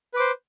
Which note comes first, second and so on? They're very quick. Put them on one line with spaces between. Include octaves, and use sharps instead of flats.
B4 D6 C5